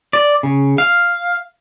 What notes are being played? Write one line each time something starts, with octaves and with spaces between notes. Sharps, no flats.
D5
C#3
F5